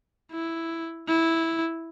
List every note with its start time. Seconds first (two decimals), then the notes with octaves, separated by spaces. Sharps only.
0.32 E4
1.08 E4